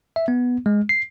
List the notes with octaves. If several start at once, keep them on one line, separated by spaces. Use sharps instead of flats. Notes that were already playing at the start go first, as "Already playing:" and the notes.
E5
B3
G#3
C7